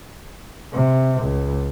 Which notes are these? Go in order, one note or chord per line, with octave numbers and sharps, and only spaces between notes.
C3
C#2